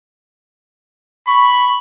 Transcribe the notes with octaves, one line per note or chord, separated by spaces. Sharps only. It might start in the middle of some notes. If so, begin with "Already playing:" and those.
B5 C#6